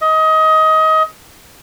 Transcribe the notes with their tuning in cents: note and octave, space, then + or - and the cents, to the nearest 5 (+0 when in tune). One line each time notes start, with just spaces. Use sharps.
D#5 +25